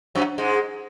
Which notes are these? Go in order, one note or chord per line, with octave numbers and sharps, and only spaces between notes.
F#2 F#3
G#2 G#3